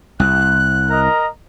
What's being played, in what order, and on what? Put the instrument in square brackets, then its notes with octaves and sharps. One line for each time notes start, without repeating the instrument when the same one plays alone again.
[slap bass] C2 [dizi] F#6
[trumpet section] A#4 D#5 A#5